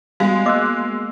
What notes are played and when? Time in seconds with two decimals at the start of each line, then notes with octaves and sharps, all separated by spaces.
0.20 G3 G#3 B3 F#4 F5
0.46 A#3 D#5 D6 E6 F#6